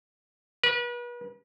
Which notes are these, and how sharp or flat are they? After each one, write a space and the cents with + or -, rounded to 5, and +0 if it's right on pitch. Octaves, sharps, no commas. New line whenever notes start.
B4 -40